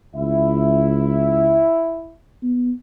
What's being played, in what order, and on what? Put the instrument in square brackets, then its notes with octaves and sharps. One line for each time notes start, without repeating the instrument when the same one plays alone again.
[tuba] C#2 [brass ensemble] E4 E5
[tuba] B3